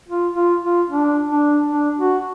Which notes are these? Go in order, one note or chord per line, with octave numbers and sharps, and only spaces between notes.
F4
F4
F4
D4
D4
D4
F#4